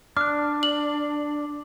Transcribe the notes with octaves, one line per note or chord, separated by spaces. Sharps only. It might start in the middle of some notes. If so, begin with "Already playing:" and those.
D4 D6 F6 F#6
F#7